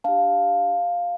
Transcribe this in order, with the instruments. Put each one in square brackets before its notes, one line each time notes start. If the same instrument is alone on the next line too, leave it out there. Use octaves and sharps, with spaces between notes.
[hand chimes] D4 G4 F5 A5